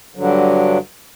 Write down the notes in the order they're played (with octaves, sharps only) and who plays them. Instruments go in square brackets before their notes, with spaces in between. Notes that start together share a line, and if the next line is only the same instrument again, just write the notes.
[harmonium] G2 D3 F#3